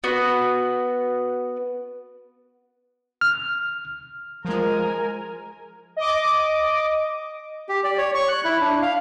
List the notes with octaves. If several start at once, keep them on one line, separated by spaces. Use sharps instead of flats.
B3 F#4
F6
F3 G#3 A#4 G#5
D#5 D6
G4
D5
C#5
C#6
F#6
E4
D4
F5